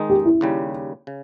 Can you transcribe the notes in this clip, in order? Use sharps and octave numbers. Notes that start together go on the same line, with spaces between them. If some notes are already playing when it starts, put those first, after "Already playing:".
Already playing: D#3 G#3 D#4
G4
E4
D#2 C#3 G3
C#3